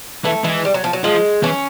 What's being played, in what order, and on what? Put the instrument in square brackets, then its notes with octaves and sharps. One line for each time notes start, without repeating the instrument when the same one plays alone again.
[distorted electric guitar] E3 [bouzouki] A3
[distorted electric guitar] E3 [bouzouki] G#3
[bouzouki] G3
F#3
F3
F#3
[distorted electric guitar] F3 [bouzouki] G#3
[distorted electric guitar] E3 [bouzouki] C#4